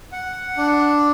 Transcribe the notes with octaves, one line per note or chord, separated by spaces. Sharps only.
F#5
D4